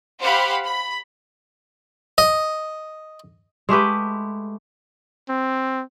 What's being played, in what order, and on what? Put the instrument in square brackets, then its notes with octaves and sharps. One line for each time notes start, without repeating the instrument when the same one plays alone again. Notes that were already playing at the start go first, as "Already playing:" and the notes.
[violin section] G4 C5 F5 F#5 B5
B5
[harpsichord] D#5
[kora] G#3 A3 G4 B4
[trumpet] C4